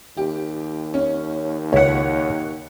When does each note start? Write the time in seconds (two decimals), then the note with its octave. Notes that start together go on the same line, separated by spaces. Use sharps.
0.17 D#2 G4
0.94 C#4
1.73 C#2 E4 C#5 F#5